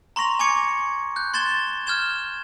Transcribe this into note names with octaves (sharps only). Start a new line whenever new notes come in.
A#5 C6 C#6 A#6 F7
G#5 C#6 D6 G#6 C#7
F#6 G6
C6 G#6 A6 E7 G7
F6 G6 G#6 E7 G7